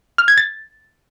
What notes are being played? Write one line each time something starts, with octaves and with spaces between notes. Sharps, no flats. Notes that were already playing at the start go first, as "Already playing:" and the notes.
F6
G#6
A6